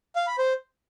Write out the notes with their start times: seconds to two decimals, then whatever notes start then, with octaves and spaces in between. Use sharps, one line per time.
0.16 F5
0.27 B5
0.38 C5